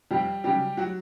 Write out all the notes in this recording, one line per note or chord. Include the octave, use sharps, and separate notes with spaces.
F2 G3 G4
C#3 F#3 G3 G4
F#3 F#4